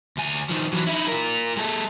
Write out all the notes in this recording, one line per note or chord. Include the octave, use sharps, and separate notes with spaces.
D2 G#5
D#3 F3
E3 F#3
D#4 E4
F4 A#4
G#3 A4